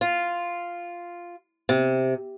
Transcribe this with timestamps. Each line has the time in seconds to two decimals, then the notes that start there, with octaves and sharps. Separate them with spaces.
0.01 F4
1.69 C3